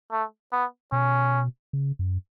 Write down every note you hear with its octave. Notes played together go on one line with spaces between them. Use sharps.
A3
B3
B2 C#4
C#3
F#2